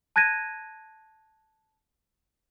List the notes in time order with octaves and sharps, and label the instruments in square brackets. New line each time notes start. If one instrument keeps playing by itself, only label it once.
[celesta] A5 F#6 G#6 A#6 D#7